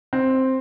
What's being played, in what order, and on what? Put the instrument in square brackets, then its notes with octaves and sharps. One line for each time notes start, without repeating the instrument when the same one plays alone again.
[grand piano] C4